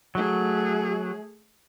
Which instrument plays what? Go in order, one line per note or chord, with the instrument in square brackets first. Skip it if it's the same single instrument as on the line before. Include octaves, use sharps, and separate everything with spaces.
[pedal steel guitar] F#3 [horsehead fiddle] A3 G#4